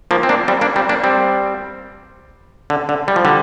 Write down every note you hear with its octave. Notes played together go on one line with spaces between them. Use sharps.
F3 A#3
C4
A#3 D4
G3 C4
A#3 D4
G3 C4
A#3 D4
G3 C4
D3
D3
G3
F3
D3 G3